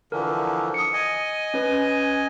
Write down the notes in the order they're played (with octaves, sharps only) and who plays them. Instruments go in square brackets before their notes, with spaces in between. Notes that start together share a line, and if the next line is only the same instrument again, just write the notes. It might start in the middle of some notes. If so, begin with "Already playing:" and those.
[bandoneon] D3 E3 F3 [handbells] A#4
[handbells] D#6 C#7
[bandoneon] D#5 G#5
[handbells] C#4 B4